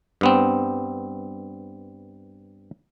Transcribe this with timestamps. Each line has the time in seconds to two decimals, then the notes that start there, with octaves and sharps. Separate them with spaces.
0.21 G2 B3 C4